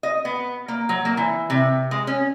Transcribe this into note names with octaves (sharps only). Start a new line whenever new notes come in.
D#5
B3
A#3
F#3
A#3
E3
C3
G#3
C#4